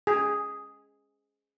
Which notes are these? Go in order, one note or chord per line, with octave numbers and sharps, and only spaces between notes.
G#4